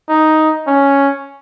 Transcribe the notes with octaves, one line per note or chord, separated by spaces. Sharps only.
D#4
C#4